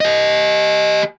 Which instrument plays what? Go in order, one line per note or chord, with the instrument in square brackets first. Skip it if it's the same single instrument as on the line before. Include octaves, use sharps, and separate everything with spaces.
[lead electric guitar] G4 D#5